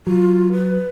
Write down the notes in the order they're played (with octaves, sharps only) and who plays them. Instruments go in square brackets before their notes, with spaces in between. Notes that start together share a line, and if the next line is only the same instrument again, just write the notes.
[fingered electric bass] F#3 [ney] F4
[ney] B4